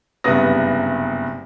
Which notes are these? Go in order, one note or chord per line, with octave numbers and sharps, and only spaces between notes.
F#1 G2 C3 B3 D#6 A#6